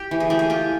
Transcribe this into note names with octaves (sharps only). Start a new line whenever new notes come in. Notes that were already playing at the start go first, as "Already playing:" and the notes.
Already playing: G4
E3
G#4
A3 G4
G#4
F4 G4